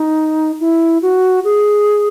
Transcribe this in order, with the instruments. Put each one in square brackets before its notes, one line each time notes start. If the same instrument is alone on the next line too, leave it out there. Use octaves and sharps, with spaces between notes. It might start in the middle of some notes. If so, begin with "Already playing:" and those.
Already playing: [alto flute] D#4
E4
F#4
G#4